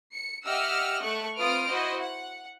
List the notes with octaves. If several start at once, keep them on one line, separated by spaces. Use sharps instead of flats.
C#7
G4 D#5 E5 F#5 E6 F6
A3 C#6 F#6
C4 F4 B4 D#6 F6 D7
E4 F#4 C5 D#5
F#5